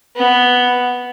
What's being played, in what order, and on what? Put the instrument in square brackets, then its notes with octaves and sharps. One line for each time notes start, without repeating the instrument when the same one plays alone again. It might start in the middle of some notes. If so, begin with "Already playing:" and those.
[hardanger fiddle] B3